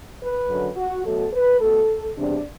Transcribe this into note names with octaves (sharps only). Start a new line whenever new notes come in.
B4
F#2 D3 F#3
F#4
B2 F#3 A3 A4
B4
B2 A3 A4
E2 C3 G3 D4